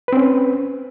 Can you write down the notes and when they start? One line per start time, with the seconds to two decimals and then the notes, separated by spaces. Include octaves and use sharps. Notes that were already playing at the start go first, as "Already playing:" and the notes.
0.08 B4
0.13 C4
0.17 C#4